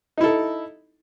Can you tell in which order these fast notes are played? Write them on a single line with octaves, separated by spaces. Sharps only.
D#4 E4 A4